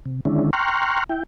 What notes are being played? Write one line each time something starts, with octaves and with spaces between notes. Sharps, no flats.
C3
D3 D#3 G#3 C#4 D4 E4
G5 A#5 C6 C#6 F6 F#6
E4 G5